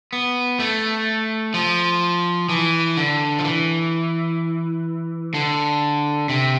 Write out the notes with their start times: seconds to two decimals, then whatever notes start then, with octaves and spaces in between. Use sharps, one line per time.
0.13 B3
0.60 A3
1.54 F3
2.49 E3
2.97 D3
3.39 F3
3.44 E3
5.34 D3
6.29 C3